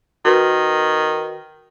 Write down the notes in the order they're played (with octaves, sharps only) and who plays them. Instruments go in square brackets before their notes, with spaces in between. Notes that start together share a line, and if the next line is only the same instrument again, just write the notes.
[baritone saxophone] D#3 [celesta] F#4 A#4 B4